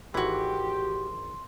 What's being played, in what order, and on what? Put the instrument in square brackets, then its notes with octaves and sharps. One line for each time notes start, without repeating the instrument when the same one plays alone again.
[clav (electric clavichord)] G#1 E3 [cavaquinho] E4 F#4 [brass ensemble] G4 [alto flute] C6